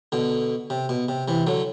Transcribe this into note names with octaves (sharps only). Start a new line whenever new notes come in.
B2 D3
C3
B2
C3
C3 E3
D3 F#3